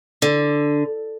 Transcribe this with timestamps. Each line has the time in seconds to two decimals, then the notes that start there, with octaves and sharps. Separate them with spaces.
0.22 D3